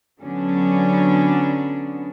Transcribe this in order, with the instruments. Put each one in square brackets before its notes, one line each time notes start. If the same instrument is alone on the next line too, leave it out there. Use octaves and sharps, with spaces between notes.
[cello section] D3 F#3 B3 C#4 D4